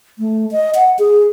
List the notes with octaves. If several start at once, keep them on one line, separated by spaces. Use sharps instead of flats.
A3
D#5
F#5
G#4